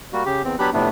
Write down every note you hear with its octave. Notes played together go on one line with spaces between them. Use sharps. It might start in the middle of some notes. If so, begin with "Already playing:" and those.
G3 A#3 F#4
C#3 G4
E2 C4
F#3 B3 D4 G4 B5 F#6
F2 A2 C3 A3 B3 D4